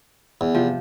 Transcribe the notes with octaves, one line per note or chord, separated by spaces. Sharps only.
E2
C3 F3